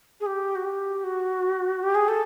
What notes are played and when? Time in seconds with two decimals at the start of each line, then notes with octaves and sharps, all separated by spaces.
0.20 G#4
0.26 G4
0.55 F#4
0.65 G4
1.04 F#4
1.83 G4
1.95 G#4
2.08 A4